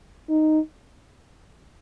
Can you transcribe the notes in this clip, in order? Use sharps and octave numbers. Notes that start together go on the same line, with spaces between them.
D#4